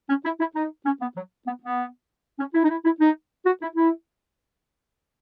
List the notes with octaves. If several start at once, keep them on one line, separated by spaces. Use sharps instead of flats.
C#4
E4
E4
D#4
C#4
B3
F#3
B3
B3
C#4
E4
D#4
E4
E4
D#4
F#4
E4
E4